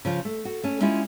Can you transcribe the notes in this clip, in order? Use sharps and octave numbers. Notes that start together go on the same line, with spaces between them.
C#3 F3 F4
A3
F#4
A3 C#4
G#3 C#4 E4 F4 G4